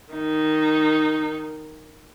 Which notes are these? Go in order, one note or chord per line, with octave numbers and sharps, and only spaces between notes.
D#3 D#4